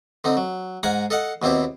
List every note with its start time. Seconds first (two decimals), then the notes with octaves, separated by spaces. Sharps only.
0.24 D3 C4 D#4
0.37 F#3
0.83 G#2 F5 F#5 G#5 A#5
1.10 A4 D#5 F5 F#5
1.42 D#2 B2 C4 E4 G4